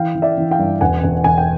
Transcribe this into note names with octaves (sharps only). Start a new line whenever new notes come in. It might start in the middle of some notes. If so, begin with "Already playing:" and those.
Already playing: E3 F5 G5
E3
D5 E5
E3
F5 G5
G2
E1 F#5 G#5
E1
E1 G#5
G5